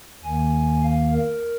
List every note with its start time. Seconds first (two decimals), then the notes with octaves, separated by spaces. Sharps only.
0.24 D#2 D#3 A#3 G#5
0.84 F5
1.13 A#4